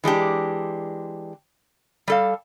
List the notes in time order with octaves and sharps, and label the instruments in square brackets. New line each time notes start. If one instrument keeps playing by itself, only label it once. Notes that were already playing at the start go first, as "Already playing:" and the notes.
[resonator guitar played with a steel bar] E3 G#3 D4 G4
G3 A4 F5